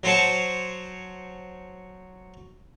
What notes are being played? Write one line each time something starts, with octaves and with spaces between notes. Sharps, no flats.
F#3 C5 C#5 F#5 A5